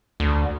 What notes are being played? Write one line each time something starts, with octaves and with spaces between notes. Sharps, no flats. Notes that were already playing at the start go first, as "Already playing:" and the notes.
D2